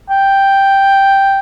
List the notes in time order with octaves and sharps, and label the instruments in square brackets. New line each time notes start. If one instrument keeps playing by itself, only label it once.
[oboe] G5